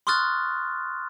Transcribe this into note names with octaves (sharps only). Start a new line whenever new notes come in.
C6 C#6 D#6 F6 F#6 A6